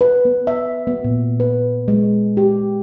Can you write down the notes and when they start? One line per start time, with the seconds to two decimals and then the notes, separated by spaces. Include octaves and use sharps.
0.01 B4
0.25 B3
0.47 E5
0.87 B3
1.04 A#2
1.40 B4
1.88 G#3
2.37 G4